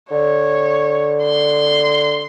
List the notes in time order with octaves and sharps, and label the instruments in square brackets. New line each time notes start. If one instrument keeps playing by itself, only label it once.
[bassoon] D3 [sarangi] C#5
[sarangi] C6